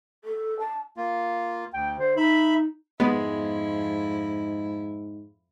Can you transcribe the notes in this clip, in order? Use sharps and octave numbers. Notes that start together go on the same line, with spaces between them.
A4
A5
A#3 F4
D2 G5
D3 C5
D#4 E5 B5
F2 G#2 G#3 B3 E4